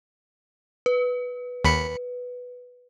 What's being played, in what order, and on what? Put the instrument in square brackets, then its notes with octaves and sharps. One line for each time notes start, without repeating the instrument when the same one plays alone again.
[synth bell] B4
[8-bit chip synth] D#2 B5 C#7